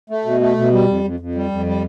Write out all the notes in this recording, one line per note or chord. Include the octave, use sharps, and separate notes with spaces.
A3
B2
A3
B2
G3
F2
F2
F2
G3
F2
G3